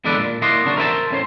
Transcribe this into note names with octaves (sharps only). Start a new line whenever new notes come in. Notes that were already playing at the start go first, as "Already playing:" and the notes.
E2 G#3 D4 A4 B4 D5
A#2
A#3 E4 D5 D#5 F#5 C6
C#3 D4 F#4
A#4 C5 E5 G5 A5
A2 C#4 C5